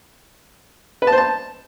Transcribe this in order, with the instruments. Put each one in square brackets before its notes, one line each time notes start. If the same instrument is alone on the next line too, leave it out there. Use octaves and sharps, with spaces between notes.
[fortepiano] B4
A5
C5
A5